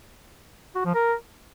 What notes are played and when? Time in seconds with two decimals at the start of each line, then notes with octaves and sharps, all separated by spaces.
0.75 F#4
0.85 F3
0.95 A#4